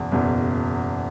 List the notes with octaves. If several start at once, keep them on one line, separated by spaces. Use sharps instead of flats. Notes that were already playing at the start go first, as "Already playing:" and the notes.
Already playing: F#1 E2 B2
F#1 E2 B2